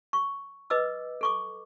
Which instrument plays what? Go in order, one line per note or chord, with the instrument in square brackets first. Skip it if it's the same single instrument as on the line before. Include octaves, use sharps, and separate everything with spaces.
[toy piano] C#6
B4 D#5 D6 E6
A4 C#6 D6